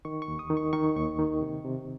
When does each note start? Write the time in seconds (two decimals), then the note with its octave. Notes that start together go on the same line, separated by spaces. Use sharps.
0.05 D#3 C#6
0.22 C#6
0.28 D#2
0.39 D#6
0.50 D#3
0.57 C#6
0.73 D#3 C#6
0.96 D#2 C#6
1.19 D#3
1.42 C3
1.65 C3